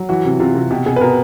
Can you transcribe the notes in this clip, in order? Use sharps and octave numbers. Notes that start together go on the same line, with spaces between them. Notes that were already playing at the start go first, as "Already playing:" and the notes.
Already playing: F#3
E3 F#4
C3
C3 F4
C3
B2 G4
B2 G#4
B4
B2 A#4